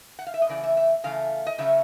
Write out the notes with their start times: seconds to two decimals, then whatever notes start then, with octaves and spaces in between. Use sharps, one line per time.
0.19 F#5
0.27 F5
0.34 E5
0.42 D#5
0.49 C#3 E3 A3 D5
0.64 E5
0.77 E5
1.04 C#3 E3 A3 F5
1.47 D#5
1.58 C#3 F#3 A3 C#4 E5